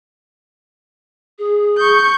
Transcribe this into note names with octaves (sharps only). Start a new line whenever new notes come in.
G#4
C#6 G6